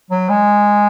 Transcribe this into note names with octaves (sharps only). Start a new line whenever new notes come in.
F#3
G#3